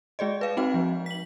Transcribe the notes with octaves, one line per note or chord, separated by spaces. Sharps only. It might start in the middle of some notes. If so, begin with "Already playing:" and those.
G#3 G#4 D5 D#5
B4 F5
C4 D#4 F#4 G5
F3
B6 F#7